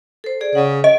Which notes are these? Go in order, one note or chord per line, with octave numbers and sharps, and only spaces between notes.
A4 C5
G#4 D5
C#3 F#5
D#5